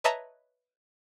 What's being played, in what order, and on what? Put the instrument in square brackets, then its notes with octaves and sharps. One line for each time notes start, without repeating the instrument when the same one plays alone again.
[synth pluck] B4 C#5 D#5 E5 A5 A#5